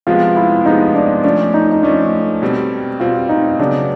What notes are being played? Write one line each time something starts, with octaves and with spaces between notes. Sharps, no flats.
C3 F3 G#3 B3 F4
E4
C3 F3 G#3 B3 D#4
D4
F3 A3 C#4 D4
D#4
D#4
F3 A3 C#4 D4
B2 G3 C4
B2 G3 C4 F4
D#4
C#3 F#3 B3 D4